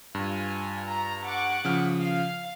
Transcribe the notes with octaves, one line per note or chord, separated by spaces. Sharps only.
G2 F4 G#5
A#5
F#5 C#6 D6
C#3 F3 F6
F5